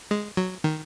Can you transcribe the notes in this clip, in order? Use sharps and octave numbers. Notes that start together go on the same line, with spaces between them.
G#3
F#3
D#3